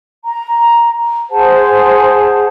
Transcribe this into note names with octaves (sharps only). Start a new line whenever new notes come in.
A#5
G#4 C5 F#5 A5